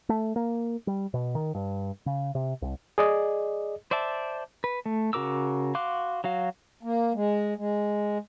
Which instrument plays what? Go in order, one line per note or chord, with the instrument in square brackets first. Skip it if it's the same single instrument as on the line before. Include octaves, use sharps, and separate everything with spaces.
[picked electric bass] A3
A#3
G3
B2
D#3
G2
C#3
C3
C2
[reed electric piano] G#4 D5 D#5
[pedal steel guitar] C5 D5 E5 A5
B4
A3
C#3 F#4 A#4 D6 E6
F#4 F5 C6 D6 F#6
F#3 F#4 F5
[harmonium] A#3
G#3
G#3